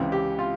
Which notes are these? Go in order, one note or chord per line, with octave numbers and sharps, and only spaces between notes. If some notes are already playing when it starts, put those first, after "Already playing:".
Already playing: C#2 C3 E3
G4
F4